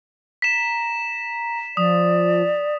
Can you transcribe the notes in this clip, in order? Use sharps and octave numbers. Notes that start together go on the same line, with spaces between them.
A#5 B6 E7
F3 D5 D#6